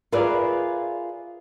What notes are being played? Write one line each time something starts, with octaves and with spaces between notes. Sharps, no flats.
F4 G#4 A#4 B4 D5 E5